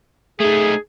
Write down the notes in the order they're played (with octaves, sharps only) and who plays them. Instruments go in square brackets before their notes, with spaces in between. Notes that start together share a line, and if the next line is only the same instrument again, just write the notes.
[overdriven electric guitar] A3 D#4 [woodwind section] G#4